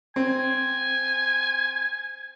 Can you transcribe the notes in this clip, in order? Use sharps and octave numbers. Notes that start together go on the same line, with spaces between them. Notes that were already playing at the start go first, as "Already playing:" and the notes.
C4 G#5